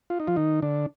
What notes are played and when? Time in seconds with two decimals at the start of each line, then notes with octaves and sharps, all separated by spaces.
0.10 F4
0.20 D#4
0.27 F3 F4
0.36 D#3 D#4
0.62 D3 D4